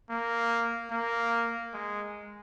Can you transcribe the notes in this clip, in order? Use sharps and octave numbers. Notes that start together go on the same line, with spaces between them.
A#3
A#3
G#3